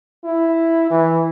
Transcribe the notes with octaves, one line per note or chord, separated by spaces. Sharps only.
E4
E3